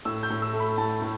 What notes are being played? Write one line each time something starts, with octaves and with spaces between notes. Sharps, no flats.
A2 E6
G6
A2
E6
A3
B5
A2 A5
A2